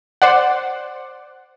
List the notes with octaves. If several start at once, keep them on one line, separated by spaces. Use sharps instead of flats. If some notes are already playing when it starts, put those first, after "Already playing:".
C5 D5 F#5